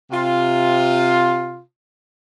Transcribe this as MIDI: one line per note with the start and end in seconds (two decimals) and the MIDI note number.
0.11 1.62 48
0.11 1.62 65